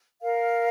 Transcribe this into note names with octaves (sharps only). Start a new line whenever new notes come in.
A#4 F5